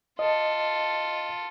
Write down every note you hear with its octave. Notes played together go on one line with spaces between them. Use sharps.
F4 A4 D#5